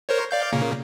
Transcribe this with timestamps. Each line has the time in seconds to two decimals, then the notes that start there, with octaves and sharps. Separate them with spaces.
0.09 A#4 C5 C#5
0.31 D5 F5 G6
0.52 A#2 C#3 A#3